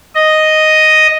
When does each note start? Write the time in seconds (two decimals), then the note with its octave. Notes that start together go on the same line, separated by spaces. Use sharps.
0.15 D#5